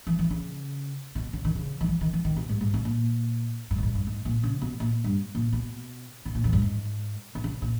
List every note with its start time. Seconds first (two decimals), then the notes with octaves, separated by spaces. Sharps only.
0.07 E3
0.19 E3
0.30 C#3
1.15 B2
1.33 C#3
1.45 D#3
1.55 C#3
1.81 D#3
1.89 E3
2.01 D#3
2.13 E3
2.25 D#3
2.36 B2
2.49 G#2
2.61 G#2
2.74 B2
2.85 A#2
3.71 G2
3.78 A#2
3.83 G#2
3.95 G2
4.07 G#2
4.25 A#2
4.43 C#3
4.62 B2
4.80 A#2
5.04 G2
5.35 A#2
5.53 B2
6.25 B2
6.35 A#2
6.44 E2
6.53 G2
6.62 G#2
7.35 B2
7.44 C#3
7.62 A#2